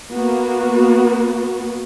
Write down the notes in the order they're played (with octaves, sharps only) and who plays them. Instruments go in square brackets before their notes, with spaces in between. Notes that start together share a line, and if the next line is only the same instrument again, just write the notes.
[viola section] A#3 B3 F#4